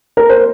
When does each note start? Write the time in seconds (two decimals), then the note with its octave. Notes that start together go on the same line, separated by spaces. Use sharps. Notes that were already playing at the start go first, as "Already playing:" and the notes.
0.17 A#4
0.30 C5